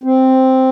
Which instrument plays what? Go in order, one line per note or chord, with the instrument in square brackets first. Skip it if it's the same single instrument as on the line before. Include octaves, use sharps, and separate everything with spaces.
[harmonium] C4